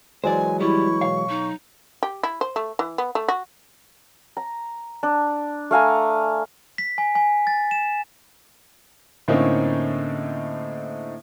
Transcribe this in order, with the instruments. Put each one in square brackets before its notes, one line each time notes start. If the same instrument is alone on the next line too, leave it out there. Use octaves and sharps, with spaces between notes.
[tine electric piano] E3 F#3 G#3 [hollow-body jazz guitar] C5 D5 [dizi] G#5
[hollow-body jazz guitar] G3 B4 [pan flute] E4 [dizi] C#6
[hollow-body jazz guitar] B1 C#5 F5
[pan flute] D#4
[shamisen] G4
E4
C5
A3
E3
B3
A3
F#4
[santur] A#5
D4
A3 F5 G#5 A#5
[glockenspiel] B6
G#5
G#5
A6
E7
[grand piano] A2 D3 A#3 C4 C#4 D#4